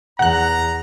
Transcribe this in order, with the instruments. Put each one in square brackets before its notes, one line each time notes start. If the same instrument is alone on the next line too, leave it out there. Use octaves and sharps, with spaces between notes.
[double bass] E2 [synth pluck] F#5 F#6 [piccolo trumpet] A#5